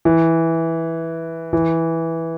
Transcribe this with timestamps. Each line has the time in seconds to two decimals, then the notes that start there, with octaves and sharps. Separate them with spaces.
0.05 E3
1.53 E3